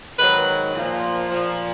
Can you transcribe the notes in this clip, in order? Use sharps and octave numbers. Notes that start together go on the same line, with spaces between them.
G#2 D#3 F#3 B4
A#2 F3
A#2 F3